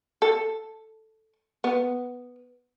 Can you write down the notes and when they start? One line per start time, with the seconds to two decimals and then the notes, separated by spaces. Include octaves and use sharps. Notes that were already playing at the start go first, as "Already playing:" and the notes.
0.22 A4
1.64 B3